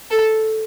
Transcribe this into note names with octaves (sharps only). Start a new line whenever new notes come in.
A4